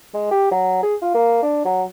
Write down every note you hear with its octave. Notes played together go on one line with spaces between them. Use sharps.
G#3
G4
F#3
G#4
F4
A#3
D4
F#3